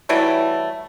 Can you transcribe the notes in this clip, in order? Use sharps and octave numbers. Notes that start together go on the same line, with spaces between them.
E3 F#3 G3 A3